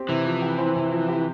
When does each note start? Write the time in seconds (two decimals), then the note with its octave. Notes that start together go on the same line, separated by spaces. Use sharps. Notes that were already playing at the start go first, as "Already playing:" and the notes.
Already playing: C4 G4
0.09 C3 E3
0.26 F3
0.42 G4
0.58 C4
0.76 C3
0.92 F3
1.09 G4